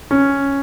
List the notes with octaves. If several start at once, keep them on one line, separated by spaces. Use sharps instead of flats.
C#4